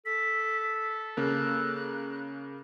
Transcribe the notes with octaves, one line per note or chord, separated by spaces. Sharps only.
A4 B6
C#3 A#3 A#4 F#6